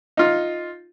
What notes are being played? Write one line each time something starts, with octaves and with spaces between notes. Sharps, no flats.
D#4 F4